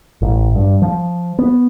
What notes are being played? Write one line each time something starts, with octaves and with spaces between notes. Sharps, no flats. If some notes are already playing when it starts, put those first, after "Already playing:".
A1
G2
F3
B3